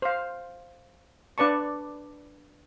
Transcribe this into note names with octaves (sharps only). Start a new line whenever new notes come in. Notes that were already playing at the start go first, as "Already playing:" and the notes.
C5 F5
D4 B4 D5 A5 C#6